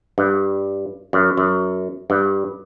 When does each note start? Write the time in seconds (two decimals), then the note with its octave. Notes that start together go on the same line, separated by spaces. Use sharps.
0.18 G2
1.13 F#2
1.38 F#2
2.10 G2